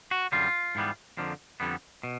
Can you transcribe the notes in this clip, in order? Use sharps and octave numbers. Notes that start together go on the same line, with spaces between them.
F#4
F#2 D3 G3 F4
G#2 E3 G3 B3
F2 D3 F3 A#3
F2 D3 G3 B3
B2